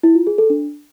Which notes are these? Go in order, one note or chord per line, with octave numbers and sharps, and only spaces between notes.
E4
F4
G#4
A4
D4